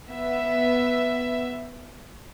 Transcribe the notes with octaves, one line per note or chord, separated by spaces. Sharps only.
B3 E5